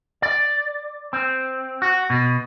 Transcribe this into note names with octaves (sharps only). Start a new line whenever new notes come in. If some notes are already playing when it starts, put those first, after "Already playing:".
D5
C4
F#4
B2